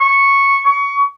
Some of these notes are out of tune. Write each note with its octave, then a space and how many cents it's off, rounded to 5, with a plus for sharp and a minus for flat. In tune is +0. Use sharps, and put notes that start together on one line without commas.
C#6 -5
C#6 +20